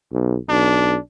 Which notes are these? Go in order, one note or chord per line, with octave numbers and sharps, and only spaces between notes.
B1
B1 D4